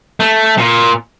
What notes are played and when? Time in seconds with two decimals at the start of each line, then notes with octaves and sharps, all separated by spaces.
0.20 A3
0.58 A#2